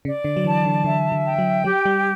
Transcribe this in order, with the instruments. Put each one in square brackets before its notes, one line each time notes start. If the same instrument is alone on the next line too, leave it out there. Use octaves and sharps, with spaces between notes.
[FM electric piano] C#3 [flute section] D5
[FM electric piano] D3
F#3
[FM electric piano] E3 [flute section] A5
[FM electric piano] D3
[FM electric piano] D3 [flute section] E5
[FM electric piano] D3
[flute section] G5
[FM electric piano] F#3
[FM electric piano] F#3 [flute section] G4
[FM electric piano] G3